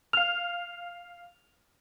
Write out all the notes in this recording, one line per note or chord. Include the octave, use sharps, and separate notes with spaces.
F5 F6 F7